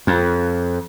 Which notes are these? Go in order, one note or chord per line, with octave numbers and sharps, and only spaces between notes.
F2